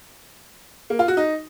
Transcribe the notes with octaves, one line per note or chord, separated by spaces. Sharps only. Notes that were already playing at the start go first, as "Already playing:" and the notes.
A#3
F4
F#4
D#4